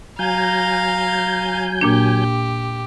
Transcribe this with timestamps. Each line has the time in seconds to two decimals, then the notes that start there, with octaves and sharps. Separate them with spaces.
0.19 F#3 F5 G#5 A#5 G6
1.81 A#2 A#3 D4 G4